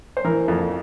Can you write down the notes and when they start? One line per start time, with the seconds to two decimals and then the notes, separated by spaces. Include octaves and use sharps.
0.17 C5
0.24 E3 A#4
0.48 F2